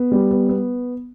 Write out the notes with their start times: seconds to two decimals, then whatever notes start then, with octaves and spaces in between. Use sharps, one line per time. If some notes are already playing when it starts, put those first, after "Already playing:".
Already playing: B3
0.12 G3
0.31 B3
0.49 B3